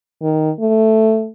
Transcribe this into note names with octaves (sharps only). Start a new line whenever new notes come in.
D#3
A3